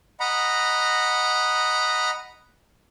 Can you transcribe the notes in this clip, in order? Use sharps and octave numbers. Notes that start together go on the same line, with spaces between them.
D#5 F#5 A#5 B5